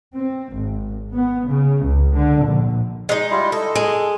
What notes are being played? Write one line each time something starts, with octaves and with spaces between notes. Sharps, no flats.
C4
G#1
B3
C#3
C#2
D3
A#1
G#3 D#4
G3 E4 F4
A4 D#5
G#3